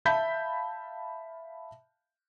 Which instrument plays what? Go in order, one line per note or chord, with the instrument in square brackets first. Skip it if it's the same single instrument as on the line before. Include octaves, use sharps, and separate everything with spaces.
[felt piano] E5 F5 A5 B5 G6 B6